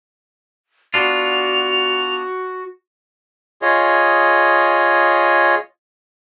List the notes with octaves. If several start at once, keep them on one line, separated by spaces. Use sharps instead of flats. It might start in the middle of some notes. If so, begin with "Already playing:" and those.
B3 D4 F4 F#4 F7
F4 G#4 C#5 D#5